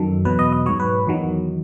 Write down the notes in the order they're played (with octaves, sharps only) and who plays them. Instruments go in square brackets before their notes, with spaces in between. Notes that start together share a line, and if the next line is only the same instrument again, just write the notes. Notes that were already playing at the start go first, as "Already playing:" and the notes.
Already playing: [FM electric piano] F#2 D#3 F#3 A4
E2 B2 F#3 B4
D#5
D#5
G#2 F#3 C#5
B4
E2 D#3 F#3